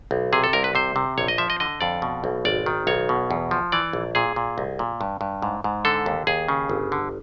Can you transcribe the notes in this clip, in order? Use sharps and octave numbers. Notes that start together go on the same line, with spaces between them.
B1
C3 G#4
A4
C2 A#4
B4
C3 C5
C3
A#1 C#5
D#5
F3 E5
D#5
D3 D#5
F2 D5
B2
B1
G#1 D5
D#3
B1 C#5
B2
E2
F3
E3 D5
A#1
A#2 G#4
A#2
C2
A#2
G2
G2
G#2
G#2
D3 A4
D#2
D#2 G#4
C#3
G1
D3